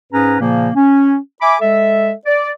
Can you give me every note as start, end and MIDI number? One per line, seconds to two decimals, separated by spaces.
0.13 0.36 44
0.13 0.36 61
0.13 0.36 68
0.13 0.36 71
0.13 0.36 82
0.40 0.69 46
0.40 0.69 49
0.40 0.69 53
0.40 0.69 58
0.75 1.15 61
1.41 1.55 76
1.41 1.55 80
1.41 1.55 83
1.41 1.55 86
1.61 2.12 56
1.61 2.12 69
1.61 2.12 76
2.26 2.50 74